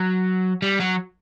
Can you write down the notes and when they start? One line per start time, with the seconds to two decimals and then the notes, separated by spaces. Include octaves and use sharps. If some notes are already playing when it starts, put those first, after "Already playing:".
Already playing: F#3
0.62 G3
0.80 F#3